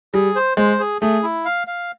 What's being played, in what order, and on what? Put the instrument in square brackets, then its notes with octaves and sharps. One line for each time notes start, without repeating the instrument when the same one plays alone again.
[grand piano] G3 [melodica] G#4
[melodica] C5
[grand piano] G#3 [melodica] C5
[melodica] G#4
[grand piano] A3 [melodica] G#4
[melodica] E4
F5
F5